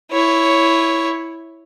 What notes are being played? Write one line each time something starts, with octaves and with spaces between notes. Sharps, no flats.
E4 C#5